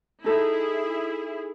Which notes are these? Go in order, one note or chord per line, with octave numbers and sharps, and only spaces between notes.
D#4 E4 G#4 A4